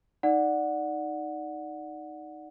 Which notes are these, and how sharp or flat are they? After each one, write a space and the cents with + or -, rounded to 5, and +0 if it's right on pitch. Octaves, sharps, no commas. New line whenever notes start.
D#4 +0 D5 +0 F#5 -10